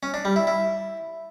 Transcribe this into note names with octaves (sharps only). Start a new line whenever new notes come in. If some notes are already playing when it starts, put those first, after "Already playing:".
C#4
D4
G3
E4
E4